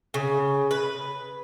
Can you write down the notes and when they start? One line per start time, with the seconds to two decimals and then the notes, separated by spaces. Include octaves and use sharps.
0.14 C#3
0.71 B4